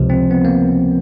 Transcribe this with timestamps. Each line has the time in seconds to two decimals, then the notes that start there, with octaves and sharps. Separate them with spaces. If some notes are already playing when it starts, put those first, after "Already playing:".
Already playing: C#2 C3 F3
0.10 C4
0.31 B3
0.45 A#3